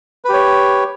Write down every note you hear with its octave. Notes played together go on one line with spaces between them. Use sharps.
G4 B4 C#5